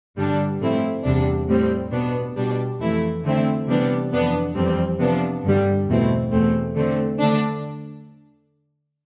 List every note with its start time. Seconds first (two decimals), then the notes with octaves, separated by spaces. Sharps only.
0.16 G2 D3 G3 D4
0.60 A2 F3 A3 C4 E4
1.04 E2 C3 G3 D4
1.48 A2 G3 C4
1.92 B2 B3 D4
2.36 B2 G3 D4
2.80 F2 E3 A3 E4
3.24 D3 A3 C4 E4
3.67 C3 E3 G3 B3 D4
4.12 F2 E3 B3 D4
4.55 F2 E3 G3 C4
5.00 C3 F3 B3 D4
5.43 G2 D3 G3
5.87 E2 B2 A3 C4 E4
6.31 E2 B2 A3 C4
6.75 D3 A3 C4
7.20 D3 A3 D4